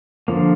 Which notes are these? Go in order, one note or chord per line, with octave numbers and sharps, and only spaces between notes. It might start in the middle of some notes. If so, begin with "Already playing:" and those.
D3 F3 A#3